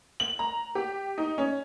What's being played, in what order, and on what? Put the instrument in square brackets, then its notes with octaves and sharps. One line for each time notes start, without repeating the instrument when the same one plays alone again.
[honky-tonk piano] F#7
A#5
G4
D#4
C#4